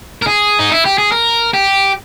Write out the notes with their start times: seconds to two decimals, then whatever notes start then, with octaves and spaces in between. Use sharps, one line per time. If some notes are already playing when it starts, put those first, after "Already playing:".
0.22 A#4
0.27 G#4
0.59 D#4
0.72 E4
0.85 G4
0.98 G#4
1.12 A#4
1.54 G4